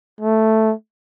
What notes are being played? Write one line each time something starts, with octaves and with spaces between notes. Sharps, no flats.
A3